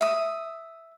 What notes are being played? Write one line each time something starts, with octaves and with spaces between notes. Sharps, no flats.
E5 D#6